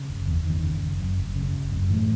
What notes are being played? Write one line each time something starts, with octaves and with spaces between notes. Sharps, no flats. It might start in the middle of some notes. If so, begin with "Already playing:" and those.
Already playing: C#3
F#1
E2
F#1 D#3
C#3
F#1
F#2
F#1
C#3
F#1
F#2
A2 E3